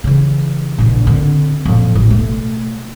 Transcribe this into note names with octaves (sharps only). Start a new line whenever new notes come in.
C#3 E3
A#1 E2
D3 C4
F2 A#2
A1
B2 A3